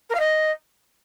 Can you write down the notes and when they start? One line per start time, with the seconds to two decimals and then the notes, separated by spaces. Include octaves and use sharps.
0.09 A#4
0.14 F5
0.19 D#5